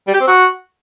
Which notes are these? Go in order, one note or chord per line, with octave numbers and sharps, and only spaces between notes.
G3
G4
C4
F#4